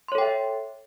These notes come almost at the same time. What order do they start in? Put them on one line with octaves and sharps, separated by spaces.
C6 C#5 A4 G5 E5